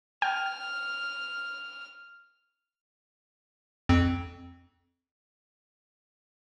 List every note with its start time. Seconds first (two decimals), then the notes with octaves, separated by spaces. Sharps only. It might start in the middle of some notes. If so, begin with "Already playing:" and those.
0.22 G5 F6
3.89 F2 C4